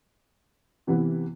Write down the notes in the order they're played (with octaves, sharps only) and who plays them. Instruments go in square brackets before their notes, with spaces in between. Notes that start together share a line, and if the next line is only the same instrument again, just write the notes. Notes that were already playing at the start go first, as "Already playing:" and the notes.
[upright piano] C3 E3 B3 E4